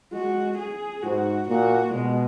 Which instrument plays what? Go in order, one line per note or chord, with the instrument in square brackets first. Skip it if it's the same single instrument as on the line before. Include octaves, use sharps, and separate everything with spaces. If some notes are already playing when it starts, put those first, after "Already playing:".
[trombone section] G#3 [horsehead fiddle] F#4
[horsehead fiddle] G#4
[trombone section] G#2 [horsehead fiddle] F#4
[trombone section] A#2 [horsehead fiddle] F#4
[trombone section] B2 [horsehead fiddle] G#3